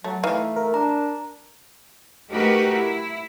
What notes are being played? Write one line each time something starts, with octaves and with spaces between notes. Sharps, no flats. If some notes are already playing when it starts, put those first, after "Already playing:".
F#3 A3
E3 A3 D#4 F5
A#4
D4 A#5
A3 D#4 F#4 G4 A#4 B4
E4